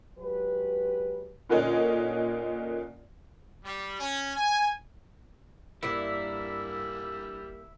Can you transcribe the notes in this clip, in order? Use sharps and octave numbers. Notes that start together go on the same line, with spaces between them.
F#3 G#3 G4 B4
A#2 D3 A#3 C#4 D#4
G3
C#4
G#5
G2 G3 A#3 E4 D5 E6